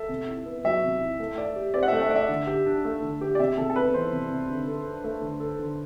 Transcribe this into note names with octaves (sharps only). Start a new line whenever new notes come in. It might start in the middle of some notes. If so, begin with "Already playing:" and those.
Already playing: A4 E5
C3
E4
B3
F#3 E5
C3
E4
A3
D5
G4
C4 D5
F#5
E5
A3
E5
D5
E5
D3
G4
D4
A3
D3
G4
D5
C3 E5
C3 A4
A4
B3 B4
E3 C5
C3
C3
D3
A4
D4
A3
D3
A4
D3